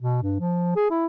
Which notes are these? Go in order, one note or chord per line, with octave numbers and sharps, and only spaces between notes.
B2
G2
F3
G#4
E4